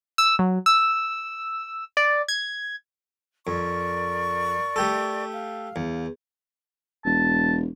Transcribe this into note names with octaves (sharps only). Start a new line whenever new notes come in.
E6
F#3
E6
D5
G#6
F2 A#4 D5 C#6
A3 G4 A4
F5
E2
E1 A5